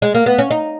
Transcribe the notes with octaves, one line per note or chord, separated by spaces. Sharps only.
G#3
A#3
B3
C#4
D#4